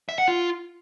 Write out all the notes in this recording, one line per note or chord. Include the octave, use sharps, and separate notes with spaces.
E5
F#5
F4